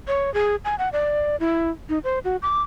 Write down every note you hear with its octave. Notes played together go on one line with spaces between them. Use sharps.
C#5
G#4
G#5
F#5
D5
E4
D#4
C5
F#4
D6